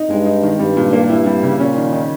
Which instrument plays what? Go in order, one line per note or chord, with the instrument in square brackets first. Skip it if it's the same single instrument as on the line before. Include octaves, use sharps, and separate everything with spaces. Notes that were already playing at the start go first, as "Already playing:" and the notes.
Already playing: [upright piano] D#4
[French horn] G2 [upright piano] G#3
[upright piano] D#4
D#3
[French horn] G2 [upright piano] G3
[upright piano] A#2
A#3
[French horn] G2 [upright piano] E4
[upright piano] G3
C#3
[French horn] A#2 [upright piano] C#4
[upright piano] D#3
D#3